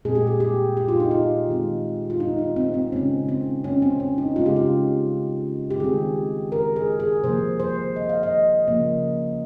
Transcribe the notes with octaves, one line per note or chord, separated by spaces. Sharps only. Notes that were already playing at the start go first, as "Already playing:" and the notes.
A#2 G#3 C4 G#4
G4
G#4
G4
G4
F4
D#4
F4
D#3 G#3 C4
F4
D#4
D#4
C4
C4
C#3 G#3 C4 C#4
C4
C#4
C4
C#4
D#4
C#3 G#3 C4 F4
G4
F4
G4
D#3 G#3 C4 G#4
A#4
G#4
G#4
C3 F3 A#3 C5
C5
D#5
F5
D#5
C#3 F3 A#3